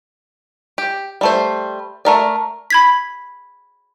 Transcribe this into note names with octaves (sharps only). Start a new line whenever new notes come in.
G4
G3 A3 C5
A3 A#4 D5
B5 G#6 B6